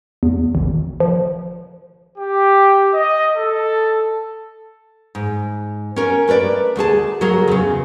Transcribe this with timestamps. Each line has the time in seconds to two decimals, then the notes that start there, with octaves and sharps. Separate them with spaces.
0.23 E2
0.55 G#1
1.00 F3
2.18 G4
2.94 D#5
3.37 A4
5.15 G#2
5.96 C#4 A#4
6.28 A3 A#4 B4 D5
6.76 D2 A3 G#4 A5
7.21 C#3 F#3 A3 G#4 A#4
7.48 E2 C#3